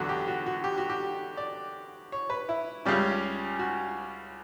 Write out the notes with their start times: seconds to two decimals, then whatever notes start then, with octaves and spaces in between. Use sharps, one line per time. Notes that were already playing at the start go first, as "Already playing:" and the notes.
Already playing: E2 D3 F#3 F#4
0.09 G4
0.28 F#4
0.46 F#4
0.64 G4
0.78 F#4
0.89 G4
1.37 D5
2.12 C#5
2.30 B4
2.49 E4
2.85 C#2 C#3 G3 C#4 G4
3.59 F#4